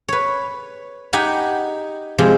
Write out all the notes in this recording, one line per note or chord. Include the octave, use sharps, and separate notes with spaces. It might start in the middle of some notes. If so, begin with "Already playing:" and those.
B4 C#5
D#4 G4 F#5 G#5 B5
C3 F3 G#3